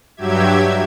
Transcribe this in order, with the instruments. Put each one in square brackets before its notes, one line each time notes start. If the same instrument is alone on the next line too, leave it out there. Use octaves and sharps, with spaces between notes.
[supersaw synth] G2 F#3 G4 E5 G#6